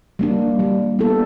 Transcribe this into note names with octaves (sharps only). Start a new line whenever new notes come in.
G3 A#3 D4
G3
B3 E4 A4